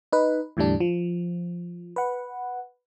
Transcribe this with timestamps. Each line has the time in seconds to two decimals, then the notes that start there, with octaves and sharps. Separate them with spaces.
0.13 D#4 B4
0.57 E2 A2 D3 G3 D4
0.80 F3
1.96 B4 F#5